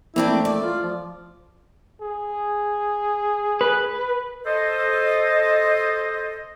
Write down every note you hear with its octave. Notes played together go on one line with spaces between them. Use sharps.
A#3 C4 D4 E4
A3
D5
F4
F3
G#4
B4
A4 C5 D#5